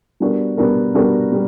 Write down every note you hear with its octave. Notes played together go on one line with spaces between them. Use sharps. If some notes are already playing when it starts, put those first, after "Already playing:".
G3 B3 D4 F#4 A#4
G3 B3 D4 F#4 A#4
G3 B3 D4 F#4 A#4
G3